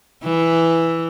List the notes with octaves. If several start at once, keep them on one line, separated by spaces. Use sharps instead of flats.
E3